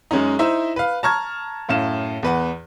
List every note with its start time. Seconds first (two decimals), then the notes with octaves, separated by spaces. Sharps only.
0.11 F#2 G#3 C#4 D#4
0.39 D#4 E4 C5 E5
0.76 B4 F5
1.03 A5 A#5 C#6 F6 G#6
1.69 F#2 A2 F5 E7
2.23 E2 B4 F#5